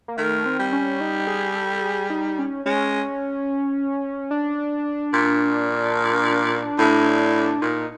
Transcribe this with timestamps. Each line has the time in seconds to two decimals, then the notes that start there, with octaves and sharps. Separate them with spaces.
0.08 A#3
0.17 D#3 A3
0.46 C4
0.59 G3
0.73 C#4
1.01 D#4
1.27 G#4
1.56 A4
1.82 G#4
2.10 D#4
2.39 C#4
2.66 G#3 C#4
4.31 D4
5.13 A#2
6.78 A2
7.61 A#2 D#4